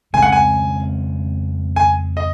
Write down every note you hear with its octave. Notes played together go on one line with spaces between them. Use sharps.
F2 C#3 G#3 C4 G#5
F#5
G#5
G#5
D#5